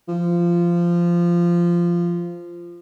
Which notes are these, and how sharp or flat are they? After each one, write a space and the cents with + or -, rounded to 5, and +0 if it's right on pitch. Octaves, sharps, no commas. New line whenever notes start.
F3 -15